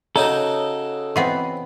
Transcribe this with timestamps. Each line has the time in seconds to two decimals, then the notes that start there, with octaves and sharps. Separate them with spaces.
0.16 C#3 D#4 F#4 A4 C#5 D#5 A#5
1.16 E3 B3 C4 D#5 F#5 C6